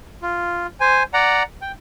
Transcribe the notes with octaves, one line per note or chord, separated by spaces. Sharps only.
F4
C5 G#5
D5 F#5 A#5
G5